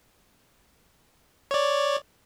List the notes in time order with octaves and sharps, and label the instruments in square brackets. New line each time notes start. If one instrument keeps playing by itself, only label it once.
[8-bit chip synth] C#5 D5